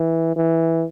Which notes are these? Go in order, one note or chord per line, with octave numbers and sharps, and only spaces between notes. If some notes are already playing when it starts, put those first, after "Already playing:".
Already playing: E3
E3